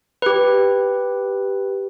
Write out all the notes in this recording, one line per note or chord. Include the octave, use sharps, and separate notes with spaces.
G4 B4